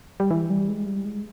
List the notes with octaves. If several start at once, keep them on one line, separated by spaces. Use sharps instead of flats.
G3
E3
G3
G#3
G3
G#3